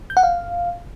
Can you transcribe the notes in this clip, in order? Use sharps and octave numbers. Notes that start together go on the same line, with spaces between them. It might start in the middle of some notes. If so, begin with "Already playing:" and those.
G6
F#5
F5